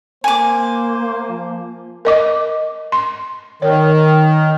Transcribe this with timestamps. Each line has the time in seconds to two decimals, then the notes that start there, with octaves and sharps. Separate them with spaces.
0.24 A#3 C5 G#5 D6
1.30 F3
2.05 A#4 D#5 D6
2.92 C6
3.62 D#3 C#5